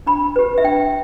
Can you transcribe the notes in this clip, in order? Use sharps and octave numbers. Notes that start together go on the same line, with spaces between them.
D4 B5
G4 B4
E5
D4 G5